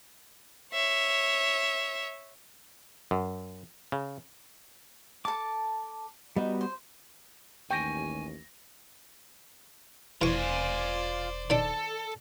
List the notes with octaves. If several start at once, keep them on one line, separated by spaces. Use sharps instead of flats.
C#5 E5
F#2
C#3
A4 A5 D6
G3 B3 D#4 F#4
C5
A1 D#2 G5 G#5 C#6 A#6
E1 E3 F4 C5 D5 G#5 C#6
D#3 D4 A4